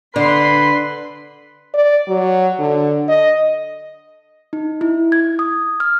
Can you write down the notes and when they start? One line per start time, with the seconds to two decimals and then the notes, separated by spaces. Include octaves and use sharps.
0.16 D3 B4 C6
1.74 D5
2.08 F#3
2.59 D3
3.09 D#5
4.53 D#4
4.81 E4
5.12 G#6
5.39 D#6
5.80 F6